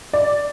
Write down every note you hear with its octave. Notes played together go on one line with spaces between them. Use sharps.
D5